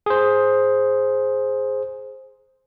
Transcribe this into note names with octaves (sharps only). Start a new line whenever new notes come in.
G#4 C5